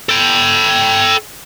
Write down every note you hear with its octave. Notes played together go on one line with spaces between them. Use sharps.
A4 G5